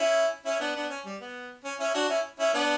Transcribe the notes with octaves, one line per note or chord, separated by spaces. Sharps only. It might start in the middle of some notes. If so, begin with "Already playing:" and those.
Already playing: C#4 E4
C#4 E4
B3 D4
B3 D4
C#4
G3
B3
C#4
C#4 E4
D4 F#4
C#4 E4
C#4 E4
B3 D4